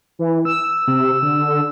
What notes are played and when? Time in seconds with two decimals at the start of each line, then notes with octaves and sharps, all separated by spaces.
0.19 E3
0.45 E6
0.88 C3
1.22 D3